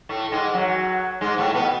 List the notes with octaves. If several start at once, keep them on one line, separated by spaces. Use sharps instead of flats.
A2 A3
G#2 G#3
F#2 F#3
G#2 G#3
A2 A3
B2 B3